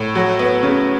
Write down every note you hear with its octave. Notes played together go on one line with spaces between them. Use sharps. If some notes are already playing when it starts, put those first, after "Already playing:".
Already playing: A2
F#3
B3
C#3